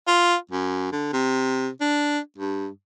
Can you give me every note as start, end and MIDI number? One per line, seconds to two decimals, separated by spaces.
0.08 0.35 65
0.51 0.87 42
0.92 1.12 50
1.13 1.69 48
1.81 2.19 62
2.38 2.67 43